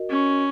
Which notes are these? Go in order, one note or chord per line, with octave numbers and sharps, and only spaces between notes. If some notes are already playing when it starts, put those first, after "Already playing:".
Already playing: F#4 A#4 D#5
C#4